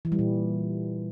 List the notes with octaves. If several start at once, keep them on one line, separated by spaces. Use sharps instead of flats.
E3
G3
A#2